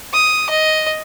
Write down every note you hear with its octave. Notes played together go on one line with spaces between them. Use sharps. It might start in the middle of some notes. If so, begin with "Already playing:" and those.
D#6
D#5